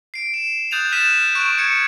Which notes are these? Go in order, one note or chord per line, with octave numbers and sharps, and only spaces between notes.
C7 D7
E7
D#6 F#6 G6 A6 D#7 F7
F6 F#6 A6 B6 D#7 E7
C#6 F#6 D7
G#6 C#7